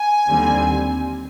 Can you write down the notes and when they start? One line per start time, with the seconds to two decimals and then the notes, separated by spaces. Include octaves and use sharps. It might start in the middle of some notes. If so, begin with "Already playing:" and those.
Already playing: G#5
0.28 D#2 D3 G3 C4